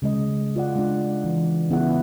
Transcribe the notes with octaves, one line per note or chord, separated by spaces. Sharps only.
C#3 G#3 D#5
F4 D5 F#5
G#3 D4
E3
C#3 B3 E4 G#4 F#5